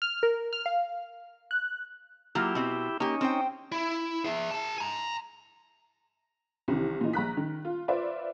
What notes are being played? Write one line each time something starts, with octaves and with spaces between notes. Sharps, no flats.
F6
A#4
F6
F5
F#6
F#3 A#3 E4 F4 G4
B2 C4
A#3 C#4 D#4 G4
C4 C5 G5
E4
G#4 E5
G#4 A5
G#5 A#5
C2 C3 D#3 E3
A#2 E3 D#4
A#1 A#5 F#6 B6
D#3
F4
F4 B4 C5 D5 E5